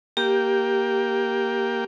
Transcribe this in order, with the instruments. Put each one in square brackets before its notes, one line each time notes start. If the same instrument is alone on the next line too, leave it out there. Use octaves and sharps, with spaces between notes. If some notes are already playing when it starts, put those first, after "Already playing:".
[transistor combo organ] A#3 G5 [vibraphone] G4